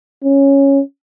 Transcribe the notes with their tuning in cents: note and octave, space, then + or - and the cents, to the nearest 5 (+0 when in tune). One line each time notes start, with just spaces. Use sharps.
C#4 -5